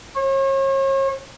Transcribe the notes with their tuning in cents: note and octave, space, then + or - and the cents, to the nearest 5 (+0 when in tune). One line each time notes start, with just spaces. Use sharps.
C#5 -40